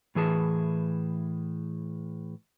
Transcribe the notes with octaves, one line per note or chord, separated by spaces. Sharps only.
A2 E3 G#4 A5